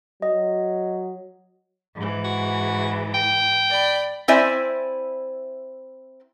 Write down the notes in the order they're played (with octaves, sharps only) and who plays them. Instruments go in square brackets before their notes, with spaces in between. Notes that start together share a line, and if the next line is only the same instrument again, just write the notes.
[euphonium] F#3 [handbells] D#5
[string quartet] G#2 E3
[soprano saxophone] F#4
G5
[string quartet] D5 B5
[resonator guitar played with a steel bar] C4 E4 C5 D5 E5 G#5